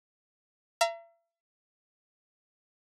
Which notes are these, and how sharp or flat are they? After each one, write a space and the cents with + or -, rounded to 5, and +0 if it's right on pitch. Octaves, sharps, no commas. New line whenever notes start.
E5 +40 A#5 +0